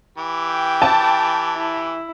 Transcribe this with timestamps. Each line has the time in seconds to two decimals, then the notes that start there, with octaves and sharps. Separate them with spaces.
0.18 E3 G4
0.50 G5
0.82 A5
1.56 E4